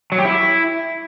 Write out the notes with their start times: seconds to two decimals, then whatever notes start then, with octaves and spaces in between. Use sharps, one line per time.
0.12 F#3
0.18 G4
0.25 E4